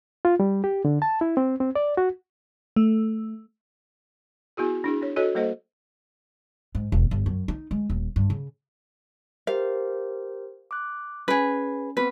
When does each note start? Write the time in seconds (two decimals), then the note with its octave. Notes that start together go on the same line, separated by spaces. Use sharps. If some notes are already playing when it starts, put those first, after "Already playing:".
0.25 F4
0.40 G3
0.64 G4
0.85 D3
1.02 A5
1.21 E4
1.37 C4
1.60 C4
1.75 D5
1.97 F#4
2.76 A3
4.57 B3 E4 F#4 G#4
4.84 D4 E4 G#4
5.02 D4 C#5
5.16 F#4 A4 C#5 D#5
5.35 G3 A#3 A4 C5 D#5
6.75 G#2
6.92 E1
7.11 G1
7.26 F#2
7.48 D#4
7.71 G#3
7.90 D#1
8.16 G2
8.30 C#3
9.47 G4 A#4 C5 F5
10.71 D6 F#6
11.28 C#4 G#4 B4
11.97 B3 C4 B4